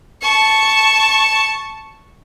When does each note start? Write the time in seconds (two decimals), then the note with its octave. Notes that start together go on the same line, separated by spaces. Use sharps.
0.22 A5 C#6